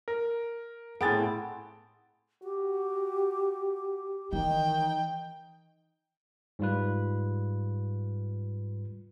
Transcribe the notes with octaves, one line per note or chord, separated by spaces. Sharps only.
A#4
A2 B3 C4 G#4 G#5 A5 A6 D7
F#4 G4
D#3 E3 D#4 G5
G#2 G3 F4 B4